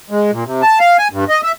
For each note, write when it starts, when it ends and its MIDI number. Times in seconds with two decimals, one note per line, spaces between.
0.11 0.31 56
0.31 0.44 46
0.46 0.62 48
0.62 0.79 81
0.80 0.97 77
0.98 1.08 80
1.12 1.25 43
1.29 1.41 75
1.43 1.52 76